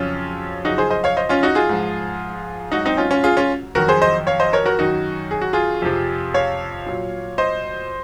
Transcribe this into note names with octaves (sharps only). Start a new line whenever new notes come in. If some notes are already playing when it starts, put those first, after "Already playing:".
Already playing: F2 C#3 F#3 C#4 F4
F#2 C#3 F3 D#4 F#4
G#4 C5
C5 D#5
C#5 F5
C5 D#5
C#4 F4
D#4 F#4
F4 G#4
G#2 F3
G#2 F#3 D#4 F#4
C4 D#4
C#4 F4
C#4 F4
F4 G#4
C#4 F4
F2 D#3 F#3 F#4 A#4
G#4 C5
C5 D#5
C#5 F5
C5 D#5
A#4 C#5
F#4 A#4
F#2 D#3 F#3 D#4 F#4
G#4
F#4
F4 G#4
F2 C3 F3
C#5 F5
A#2 F#3
C5 D#5